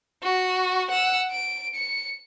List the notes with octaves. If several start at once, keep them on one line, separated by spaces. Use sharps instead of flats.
F#4
F#5 E6
D7
C#7